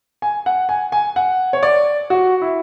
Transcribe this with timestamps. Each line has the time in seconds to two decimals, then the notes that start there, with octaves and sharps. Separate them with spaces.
0.22 G#5
0.46 F#5
0.69 G#5
0.92 G#5
1.16 F#5
1.53 C#5
1.63 D5
2.10 F#4
2.42 E4